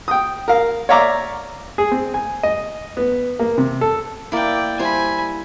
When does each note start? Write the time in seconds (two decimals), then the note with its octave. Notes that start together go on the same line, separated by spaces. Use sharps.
0.08 G5 D#6
0.48 A#4 F5
0.89 C#5 D5 E5 F5 A#5 D6
1.78 G#4
1.92 C4
2.14 G#5
2.43 D#5
2.97 B3
3.40 A#3
3.58 C3
3.81 A4
4.32 A#3 E4 D5 G5
4.79 G3 E4 C5 G#5 B5